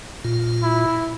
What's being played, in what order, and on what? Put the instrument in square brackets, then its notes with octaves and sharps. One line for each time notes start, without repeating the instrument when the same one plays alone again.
[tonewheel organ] A#2 F4
[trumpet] E4